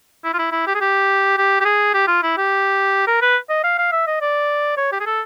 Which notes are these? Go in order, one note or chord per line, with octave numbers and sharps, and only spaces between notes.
E4
F4
E4
E4
G4
G#4
G4
G4
G4
G#4
G4
F4
E4
G4
A#4
B4
D#5
F5
F5
E5
D#5
D5
C#5
G4
G#4
A4